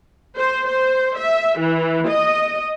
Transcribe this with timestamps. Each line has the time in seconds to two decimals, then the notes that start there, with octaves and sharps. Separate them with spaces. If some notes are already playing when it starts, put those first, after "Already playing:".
0.37 C5
0.66 C5
1.17 E5
1.59 E3
2.07 D#5